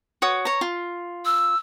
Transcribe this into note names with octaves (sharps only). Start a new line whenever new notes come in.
F#4 C#5 D#6
C#5 A#5
F4
E6